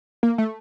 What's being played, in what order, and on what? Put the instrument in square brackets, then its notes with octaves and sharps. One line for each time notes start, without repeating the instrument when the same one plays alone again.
[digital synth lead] A#3
A3